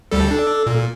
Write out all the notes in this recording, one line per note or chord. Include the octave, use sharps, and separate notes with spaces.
D2 G3 A4
D4 A4
A#2